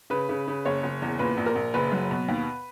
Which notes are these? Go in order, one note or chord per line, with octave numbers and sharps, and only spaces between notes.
C#3 B4
C#3
C#3
F#1 C#5
F#1
E2
A#2 B4
A#1
A#4
A#1
F#1 B4
F#3
B2
D#2